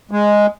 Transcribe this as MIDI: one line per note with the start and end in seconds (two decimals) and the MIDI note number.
0.11 0.46 56